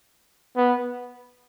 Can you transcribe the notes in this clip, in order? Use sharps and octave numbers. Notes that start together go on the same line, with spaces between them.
B3